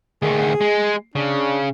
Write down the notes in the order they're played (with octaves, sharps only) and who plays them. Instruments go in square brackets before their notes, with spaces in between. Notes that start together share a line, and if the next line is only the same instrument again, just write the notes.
[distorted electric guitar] D2 D#3 [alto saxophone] G#4
[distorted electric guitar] G#3
[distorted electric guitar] C#3 [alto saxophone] D4